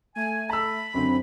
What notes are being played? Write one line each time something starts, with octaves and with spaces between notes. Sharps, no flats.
A3 G#5
A5 B5 E6
F#2 D3 C4